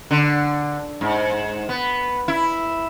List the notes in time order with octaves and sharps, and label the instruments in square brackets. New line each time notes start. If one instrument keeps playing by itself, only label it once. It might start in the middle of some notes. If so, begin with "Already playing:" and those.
[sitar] D3
G#2
B3
E4